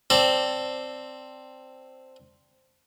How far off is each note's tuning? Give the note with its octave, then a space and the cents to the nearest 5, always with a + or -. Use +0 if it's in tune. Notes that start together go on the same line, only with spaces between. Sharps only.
C4 +0 A4 +0 D5 +0